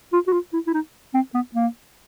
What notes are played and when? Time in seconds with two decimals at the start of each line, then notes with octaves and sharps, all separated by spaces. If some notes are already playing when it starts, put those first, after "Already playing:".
0.13 F4
0.27 F#4
0.33 F4
0.53 E4
0.67 E4
0.74 D#4
1.14 C4
1.34 B3
1.55 A#3